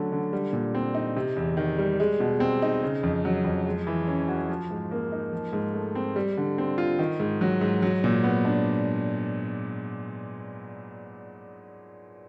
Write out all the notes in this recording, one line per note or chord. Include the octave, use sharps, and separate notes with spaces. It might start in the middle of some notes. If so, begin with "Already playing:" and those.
Already playing: D3 F#3 A3 C#4
D3
G3
A#2
C4
D#4
C3
E2
D#3
G3
G#3
B2
C4
D#4
C#3
F2
F#3
F2
G#3
E3
C#4
F#4
F3
G#2
A#3
D#4
F3
G#2
A3
C4
G3
D3
C4
F4
D#3
G#2
F#3
G#2
F#3
A#2
B3
D4